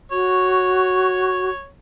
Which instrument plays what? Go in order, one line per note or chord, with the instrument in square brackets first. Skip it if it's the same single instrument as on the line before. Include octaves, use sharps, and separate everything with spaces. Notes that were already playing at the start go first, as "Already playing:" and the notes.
[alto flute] F#4 [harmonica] C#5